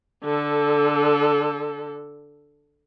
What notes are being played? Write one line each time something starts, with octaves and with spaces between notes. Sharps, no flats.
D3 A4